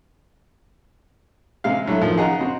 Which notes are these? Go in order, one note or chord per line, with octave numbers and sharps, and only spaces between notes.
C3 G#3 F5
D3 F#3 A3 E4
D#3 F3
C#3 G#4 D#5 F#5 A#5
C4 F#4